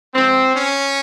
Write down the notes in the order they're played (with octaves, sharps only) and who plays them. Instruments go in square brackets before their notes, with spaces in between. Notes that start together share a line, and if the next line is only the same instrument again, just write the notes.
[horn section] G#2 F3 C4
C#4